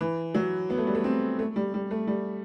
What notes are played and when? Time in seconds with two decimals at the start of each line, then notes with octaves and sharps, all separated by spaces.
0.01 E3
0.34 F#3
0.70 B3
0.78 A3
0.87 G3
0.95 A3
1.04 C4
1.39 A3
1.56 G3
1.74 G3
1.91 A3
2.07 G3